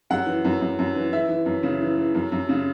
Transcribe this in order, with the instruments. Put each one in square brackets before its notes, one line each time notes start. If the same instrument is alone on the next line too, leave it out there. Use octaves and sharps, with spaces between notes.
[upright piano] F#2 F#5
E3
F#2
F#2
F#2
E3
E3 E5
E3
F#2
C#3
E3
E3
F#2
F#2
C#3